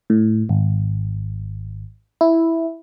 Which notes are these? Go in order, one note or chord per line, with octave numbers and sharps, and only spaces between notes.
A2
G#1
E4